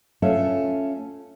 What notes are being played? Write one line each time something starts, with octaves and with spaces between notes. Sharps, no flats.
A3 C#4 D4 F4 E5